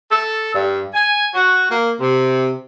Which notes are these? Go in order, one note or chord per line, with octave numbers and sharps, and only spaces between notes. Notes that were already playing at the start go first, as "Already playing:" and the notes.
A4
G2
G#5
F#4
A#3
C3